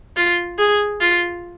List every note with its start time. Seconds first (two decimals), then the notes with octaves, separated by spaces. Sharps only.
0.16 F4
0.59 G#4
1.01 F4